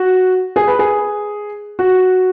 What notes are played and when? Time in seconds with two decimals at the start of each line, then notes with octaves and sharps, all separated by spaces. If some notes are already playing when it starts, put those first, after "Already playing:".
Already playing: F#4
0.56 G#4
0.68 B4
0.79 G#4
1.79 F#4